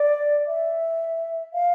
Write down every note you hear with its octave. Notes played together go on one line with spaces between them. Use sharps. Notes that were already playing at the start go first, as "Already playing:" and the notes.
Already playing: D5
E5
F5